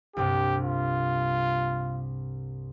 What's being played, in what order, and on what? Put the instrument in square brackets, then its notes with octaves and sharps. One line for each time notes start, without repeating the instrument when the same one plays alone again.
[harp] C2 G2 C3 [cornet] G4
[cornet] F4